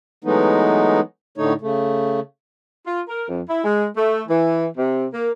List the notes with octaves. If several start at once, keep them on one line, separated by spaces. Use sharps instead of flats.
E3 F#3 G#3 A3 B3 D#4
A2 D3 A3 D#4 C#5
C#3 A3
F4
A#4
F2
E4
G#3
A3
E3
C3
A#3